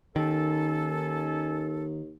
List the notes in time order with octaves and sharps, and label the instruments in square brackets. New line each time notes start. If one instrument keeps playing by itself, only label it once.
[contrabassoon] D#2 [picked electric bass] D#3 [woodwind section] A#3 C#4 A4